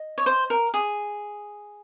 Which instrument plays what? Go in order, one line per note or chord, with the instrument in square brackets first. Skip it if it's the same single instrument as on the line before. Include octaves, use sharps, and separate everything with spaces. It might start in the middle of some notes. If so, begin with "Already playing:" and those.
Already playing: [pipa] D#5
[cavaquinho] C#5
C5
A#4
G#4